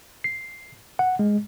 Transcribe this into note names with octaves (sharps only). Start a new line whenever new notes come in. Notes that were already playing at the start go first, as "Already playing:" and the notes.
C7
F#5
G#3